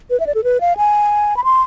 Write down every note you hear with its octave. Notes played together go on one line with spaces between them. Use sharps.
B4
E5
D5
A4
B4
F5
G#5
B5
C6